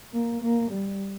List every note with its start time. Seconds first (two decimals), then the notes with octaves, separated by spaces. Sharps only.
0.13 A#3
0.42 A#3
0.71 G3